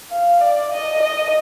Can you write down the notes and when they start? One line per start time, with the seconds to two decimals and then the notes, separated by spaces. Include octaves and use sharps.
0.11 F5
0.41 D5
0.73 D#5
1.03 D#5